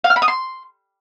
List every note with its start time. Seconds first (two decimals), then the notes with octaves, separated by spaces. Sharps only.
0.04 F5
0.10 F6
0.16 B5
0.22 D#6
0.28 C6